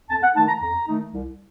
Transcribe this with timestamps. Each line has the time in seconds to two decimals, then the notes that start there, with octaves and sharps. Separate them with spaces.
0.10 F2 A5
0.23 F#5
0.35 D#3 A3 D#4 A5
0.48 A#5
0.61 F2 A#5
0.87 D#3 A3 D#4
1.13 C2